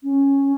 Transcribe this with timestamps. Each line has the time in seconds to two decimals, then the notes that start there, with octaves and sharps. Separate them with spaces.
0.03 C#4